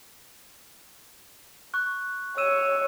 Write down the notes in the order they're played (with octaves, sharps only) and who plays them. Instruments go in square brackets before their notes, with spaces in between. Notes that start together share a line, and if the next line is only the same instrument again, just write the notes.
[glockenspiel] C#6 F#6
[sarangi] C#5 [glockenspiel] E6 D#7 E7